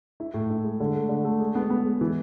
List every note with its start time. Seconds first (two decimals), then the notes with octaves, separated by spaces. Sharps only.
0.20 E4
0.34 A2
0.50 E4
0.64 G#3
0.80 D3
0.95 A3
1.09 D3
1.25 A3
1.40 G#3
1.55 B3
1.70 B3
1.85 G#3
2.01 E3